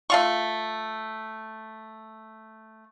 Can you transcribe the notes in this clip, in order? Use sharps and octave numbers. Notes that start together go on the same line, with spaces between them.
A3 F4 C#6